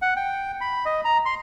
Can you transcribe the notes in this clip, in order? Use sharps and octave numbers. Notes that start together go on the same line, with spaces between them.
F#5
G5
B5
D#5
A#5
C6